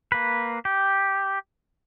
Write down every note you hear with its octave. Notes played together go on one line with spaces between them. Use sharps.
A#3 B4
G4